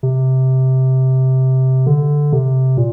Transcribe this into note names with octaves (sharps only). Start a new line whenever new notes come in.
C3
D3
C3
A#2